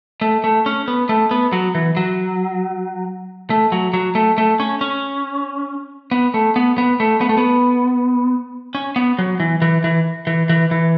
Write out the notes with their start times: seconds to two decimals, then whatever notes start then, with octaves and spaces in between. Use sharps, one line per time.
0.21 A3
0.44 A3
0.66 C#4
0.88 B3
1.09 A3
1.31 B3
1.53 F#3
1.75 E3
1.97 F#3
3.50 A3
3.72 F#3
3.94 F#3
4.15 A3
4.38 A3
4.60 C#4
4.81 C#4
6.11 B3
6.34 A3
6.56 B3
6.78 B3
7.00 A3
7.21 B3
7.29 A3
7.38 B3
8.75 C#4
8.96 B3
9.19 F#3
9.40 E3
9.62 E3
9.84 E3
10.27 E3
10.49 E3
10.71 E3